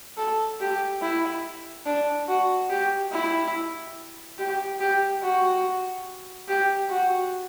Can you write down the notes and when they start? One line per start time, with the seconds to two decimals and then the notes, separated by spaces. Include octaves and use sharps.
0.17 A4
0.60 G4
1.02 E4
1.86 D4
2.28 F#4
2.70 G4
3.12 E4
4.38 G4
4.80 G4
5.22 F#4
6.48 G4
6.90 F#4